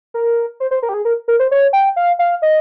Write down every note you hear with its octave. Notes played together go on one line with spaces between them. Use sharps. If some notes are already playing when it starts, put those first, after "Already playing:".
A#4
C5
C5
A#4
G4
G#4
A#4
A#4
C5
C#5
G5
F5
F5
D#5